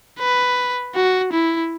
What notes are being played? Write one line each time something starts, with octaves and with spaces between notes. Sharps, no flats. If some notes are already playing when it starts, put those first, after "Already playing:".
B4
F#4
E4